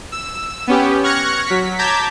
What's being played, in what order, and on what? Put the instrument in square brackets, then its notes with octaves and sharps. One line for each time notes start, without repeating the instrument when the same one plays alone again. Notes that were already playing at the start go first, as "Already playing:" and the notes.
[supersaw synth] E6
B3 C#4 G4
C#6 F6 F#6 G#6 A#6 C#7
F#3 B6
A5 A#5 D6 G6 G#6 B6